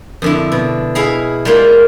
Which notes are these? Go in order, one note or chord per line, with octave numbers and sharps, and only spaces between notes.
F2 D3 E4
B2
E4 G#4 D#5 F5 B5
G3 G#3 A#3 F4